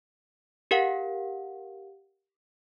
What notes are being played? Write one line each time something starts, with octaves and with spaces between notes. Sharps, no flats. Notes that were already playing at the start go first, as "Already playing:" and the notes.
G4 A#4 F5 F#5